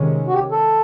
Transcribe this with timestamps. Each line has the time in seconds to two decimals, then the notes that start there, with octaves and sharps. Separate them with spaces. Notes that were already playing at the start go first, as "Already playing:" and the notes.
Already playing: C3 D#3 G#3 C#4
0.27 F#4
0.34 G4
0.52 A4